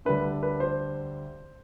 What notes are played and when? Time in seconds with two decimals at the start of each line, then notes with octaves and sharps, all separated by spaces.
0.05 D2 D3 G3 D4 B4
0.43 B4
0.60 C5